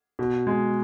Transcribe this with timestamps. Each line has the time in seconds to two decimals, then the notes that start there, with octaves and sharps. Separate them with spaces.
0.19 B2
0.47 G#3